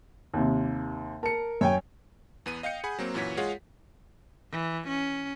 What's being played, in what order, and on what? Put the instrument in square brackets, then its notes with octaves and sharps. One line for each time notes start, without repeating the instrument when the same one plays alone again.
[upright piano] D#2 C3
[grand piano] A#4 C#7 [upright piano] A5
[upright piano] F#2 [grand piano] C#5 G5 G#5
[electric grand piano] E2 B3 D#7
D#5 F5 G5 G6 C#7
G#4 F#5 G#5 B5
F#3 A#3 C4
F#2 A#2 E3 F#4 C#5 B6
G#3 F4 G#4 C#5 F5 F#5
[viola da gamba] E3
C#4